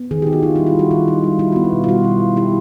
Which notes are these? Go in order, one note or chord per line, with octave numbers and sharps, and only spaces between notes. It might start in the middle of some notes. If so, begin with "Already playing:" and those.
Already playing: B3
D#3 G#4
D#4 G4
F#4
D#4 F4
G3 E4
F4
G3 F#4
D#3 F4
D#4
G3
E4 F4
B3 F#4
F4
B2
F4
G3 F#4
E4
B2
E4 G4